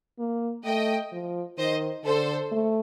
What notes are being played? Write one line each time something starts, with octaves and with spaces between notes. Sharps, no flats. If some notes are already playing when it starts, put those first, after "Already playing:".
A#3
A3 D#5 G5
F3
D#3 C5 D#5
D3 A4 C5
A3